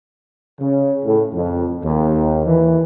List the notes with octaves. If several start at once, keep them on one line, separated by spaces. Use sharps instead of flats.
C#3
A2
F2
D#2
E3